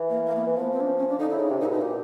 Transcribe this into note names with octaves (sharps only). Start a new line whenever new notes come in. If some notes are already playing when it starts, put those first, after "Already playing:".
Already playing: E3
A#3
A#3
B3
E3
F3 B3
C4
D4
C#4
C#4
D4
D3 D#4
E4
C#3 D#4
C3 D4
A#2 D#4
E4
B2 D#4
A#2 G4